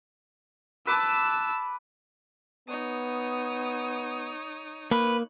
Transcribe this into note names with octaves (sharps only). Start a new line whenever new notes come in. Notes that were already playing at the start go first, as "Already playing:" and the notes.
B4 A5 D6 E6
B3 D#4 C#5 D#6
A#3 B4